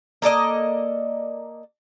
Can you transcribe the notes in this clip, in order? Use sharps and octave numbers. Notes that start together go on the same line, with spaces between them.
A#3 A4 D5 D#5